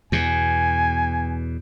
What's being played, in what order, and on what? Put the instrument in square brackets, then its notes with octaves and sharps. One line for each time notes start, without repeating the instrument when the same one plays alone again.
[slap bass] E2 B2 [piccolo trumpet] G#5